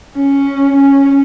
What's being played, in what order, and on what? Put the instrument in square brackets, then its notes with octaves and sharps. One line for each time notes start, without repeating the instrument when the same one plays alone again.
[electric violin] C#4
C#4